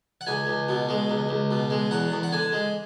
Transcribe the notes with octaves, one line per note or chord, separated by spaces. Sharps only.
F#5
C#2 G#5
C#2
B2
G#3
C#2
C#2
B2
G#3
E2 F#5
E2
F#5
D3 G#5
G#3